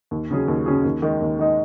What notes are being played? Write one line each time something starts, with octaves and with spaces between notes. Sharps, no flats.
D#2
C#3 F#3 C#4 G#4
D#2
C#3 F#3 C#4 G#4
D#2
D#3 G#3 D#4
D#2
D#3 G#3 D#4